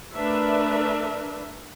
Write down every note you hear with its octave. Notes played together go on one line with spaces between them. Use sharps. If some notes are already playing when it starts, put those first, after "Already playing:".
A3 D4 A#4 B4 E5